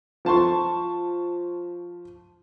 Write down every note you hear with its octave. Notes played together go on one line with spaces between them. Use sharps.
F3 A5 C6 C#6